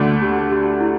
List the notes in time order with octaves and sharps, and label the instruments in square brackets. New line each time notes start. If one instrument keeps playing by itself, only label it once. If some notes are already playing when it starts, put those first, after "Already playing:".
Already playing: [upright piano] D2 D3 A3 D4
[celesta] G4
G4
E4